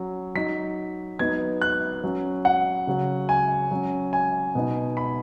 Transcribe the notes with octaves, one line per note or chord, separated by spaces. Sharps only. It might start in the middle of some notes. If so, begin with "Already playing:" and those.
Already playing: F#3 C#4
F#3 D#4 B6
F#3 B3 D#4 G#6
F#6
F#3 C#4
F#5
C#3 F#3 C#4
G#5
F#3 C#4
G#5
B2 B3 D#4
B5